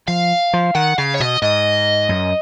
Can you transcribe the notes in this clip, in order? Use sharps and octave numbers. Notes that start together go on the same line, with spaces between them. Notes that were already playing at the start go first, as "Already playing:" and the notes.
F3 F5
F3
D#3 F#5
C#3 F5
C#5
B2 D#5
G#2 D#5
F#2